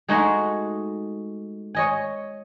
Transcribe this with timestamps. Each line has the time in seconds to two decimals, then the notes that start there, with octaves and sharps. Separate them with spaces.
0.08 G#3 A3 D#4 F#4 G#4
1.75 C#5 D#5 G#5